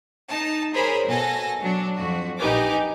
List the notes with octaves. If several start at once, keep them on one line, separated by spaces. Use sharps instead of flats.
D#4 A5
G#4 A#4 C5 C#5 B5
B2 A4 G#5 A5 A#6
F#3 D4
F2 F#4
A#1 D#4 G4 B4 G#5 D6